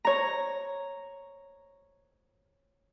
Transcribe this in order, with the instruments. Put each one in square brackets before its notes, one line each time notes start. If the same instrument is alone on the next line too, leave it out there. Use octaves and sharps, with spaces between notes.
[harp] C#5 A#5